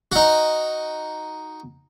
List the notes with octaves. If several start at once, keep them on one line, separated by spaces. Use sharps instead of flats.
D#4 F#4